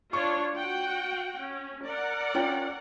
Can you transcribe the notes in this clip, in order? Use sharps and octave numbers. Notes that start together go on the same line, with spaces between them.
D4 F4 C#5 C#6
F#4 F#5 G5
C#4
A#4 D5 F#5
C#4 F4 G5